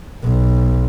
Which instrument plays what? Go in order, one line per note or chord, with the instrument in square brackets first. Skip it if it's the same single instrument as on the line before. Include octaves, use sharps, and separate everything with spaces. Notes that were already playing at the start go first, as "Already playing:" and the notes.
[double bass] B1